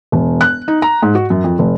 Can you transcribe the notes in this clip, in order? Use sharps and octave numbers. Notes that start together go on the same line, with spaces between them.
E1
F#6
D#4
A#5
G#2
F#4
F#2
F2
F1